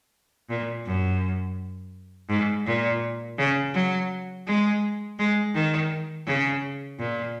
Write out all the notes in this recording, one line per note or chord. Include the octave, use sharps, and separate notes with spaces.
A#2
F#2
G#2
A#2
C#3
F#3
G#3
G#3
D#3
C#3
A#2